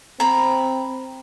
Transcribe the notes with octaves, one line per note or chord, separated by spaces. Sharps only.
C4 A#5 B5